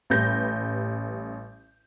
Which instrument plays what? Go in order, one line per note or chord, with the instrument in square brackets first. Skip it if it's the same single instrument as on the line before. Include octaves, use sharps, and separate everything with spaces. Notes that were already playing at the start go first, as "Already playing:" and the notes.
[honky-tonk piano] A1 G3 B4 G6 A#6